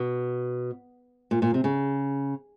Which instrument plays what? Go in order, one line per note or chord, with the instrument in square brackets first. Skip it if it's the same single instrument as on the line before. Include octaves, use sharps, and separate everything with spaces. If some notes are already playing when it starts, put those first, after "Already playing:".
Already playing: [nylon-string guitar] B2
A#2
A#2
C3
C#3